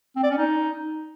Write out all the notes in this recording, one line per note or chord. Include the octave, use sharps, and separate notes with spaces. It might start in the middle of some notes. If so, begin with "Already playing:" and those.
C4
D5
C#4
D#4